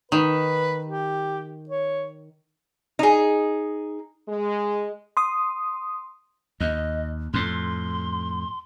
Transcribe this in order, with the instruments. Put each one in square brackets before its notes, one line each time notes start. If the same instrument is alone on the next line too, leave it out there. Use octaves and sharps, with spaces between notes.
[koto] D#3 [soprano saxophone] B4
[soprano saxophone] G4
C#5
[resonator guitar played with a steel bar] D#4 G#4
[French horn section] G#3
[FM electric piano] C6 D#6
[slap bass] D#2 [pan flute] D#5
[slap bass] F2 A2 [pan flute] C6